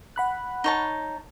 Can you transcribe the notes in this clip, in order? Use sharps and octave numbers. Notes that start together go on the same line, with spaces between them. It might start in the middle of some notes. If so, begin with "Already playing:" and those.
F#5 B5 F#6
D#4 C#5 A5